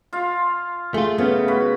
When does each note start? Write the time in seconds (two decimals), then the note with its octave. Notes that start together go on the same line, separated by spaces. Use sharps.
0.13 F4 F5
0.94 A3 F4 G#4
1.18 C#3 B3
1.48 F#4 B5